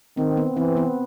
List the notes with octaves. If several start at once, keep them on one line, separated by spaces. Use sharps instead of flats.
D#3 C4
B3
E3 C4
B3